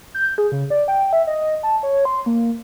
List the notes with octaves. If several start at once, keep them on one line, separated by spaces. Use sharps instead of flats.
G6
G#4
C#3
D5
G5
E5
D#5
A5
C#5
C6
A#3